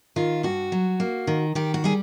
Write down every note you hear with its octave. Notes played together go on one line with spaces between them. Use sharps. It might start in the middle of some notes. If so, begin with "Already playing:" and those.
D#3 F4
G2 F#4
F#3
A#3
D#3
D#3 G4
F#4
G3 G#4